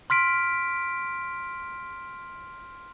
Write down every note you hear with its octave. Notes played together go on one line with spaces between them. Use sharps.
C6 F6 B6 D7